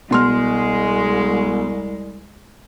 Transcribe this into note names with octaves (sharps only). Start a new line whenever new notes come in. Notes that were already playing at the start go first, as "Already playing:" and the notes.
C2 B2 G#3 C6 F6